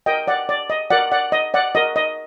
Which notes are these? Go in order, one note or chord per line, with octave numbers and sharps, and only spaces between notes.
F#4 A#4 D#5 G5
D5 F#5
D5
D#5
F#4 A#4 D5 F#5
D5 F#5
D#5
D5 F#5
F#4 A#4 D#5
D#5